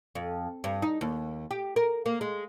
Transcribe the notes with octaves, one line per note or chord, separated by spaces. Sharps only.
F2
G2
D#4
D#2
G4
A#4
A#3
G#3